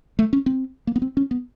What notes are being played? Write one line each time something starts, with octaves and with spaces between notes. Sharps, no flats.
A3
C#4
C4
A#3
B3
C4
C#4
B3